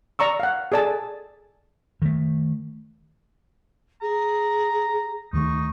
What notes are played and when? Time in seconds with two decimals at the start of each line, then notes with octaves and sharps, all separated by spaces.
0.19 D5 A#5 C#6 E6
0.40 F5 F#5
0.72 G#4 A4 D5 G#5 A5
2.02 D#3 A3
4.02 G#4 A#5
5.33 D2 D#3 A3 D#4 C#6